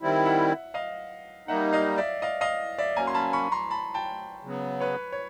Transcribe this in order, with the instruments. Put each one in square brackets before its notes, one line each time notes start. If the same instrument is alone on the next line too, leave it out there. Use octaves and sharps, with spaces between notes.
[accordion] D#3 G3 C4 E4
[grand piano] E5 F#5
D#5 F5
[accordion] G3 A#3 D#4 [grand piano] E5 F#5
[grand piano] D#5 F5
D5 E5
D#5 F5
D#5 F5
D5 E5
[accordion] F#3 A#3 C#4 [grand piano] G#5 A#5
[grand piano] C6
A5 B5
B5 C#6
A#5 C6
A5 B5
G5 A5
[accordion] C#3 F#3 B3
[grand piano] B4 C#5
C#5